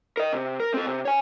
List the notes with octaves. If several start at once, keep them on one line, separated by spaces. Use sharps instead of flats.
A#4 D#5
C3
A#4
C4 A4
C3
C#5 G#5